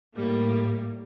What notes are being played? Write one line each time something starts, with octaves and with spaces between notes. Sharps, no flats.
A2 G3 A#3